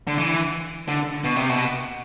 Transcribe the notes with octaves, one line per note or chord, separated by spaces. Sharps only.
D3
E3
D3
B2
C3
B2